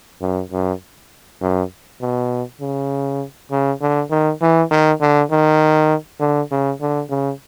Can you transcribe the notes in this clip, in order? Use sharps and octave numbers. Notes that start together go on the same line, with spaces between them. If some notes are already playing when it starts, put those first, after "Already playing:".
F#2
F#2
F#2
B2
C#3
C#3
D3
D#3
E3
D#3
D3
D#3
D3
C#3
D3
C#3